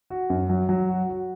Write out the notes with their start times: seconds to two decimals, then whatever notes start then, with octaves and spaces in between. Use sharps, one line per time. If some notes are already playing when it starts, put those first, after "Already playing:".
0.10 F#4
0.30 F#2
0.50 F#3
0.69 F#3
0.89 F#4
1.09 F#4